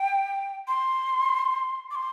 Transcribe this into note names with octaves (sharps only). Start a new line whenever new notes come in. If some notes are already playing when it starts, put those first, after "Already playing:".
Already playing: G5
C6
D6
C6